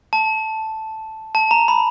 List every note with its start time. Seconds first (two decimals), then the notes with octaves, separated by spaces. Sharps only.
0.13 A5
1.35 A5
1.51 A#5
1.68 B5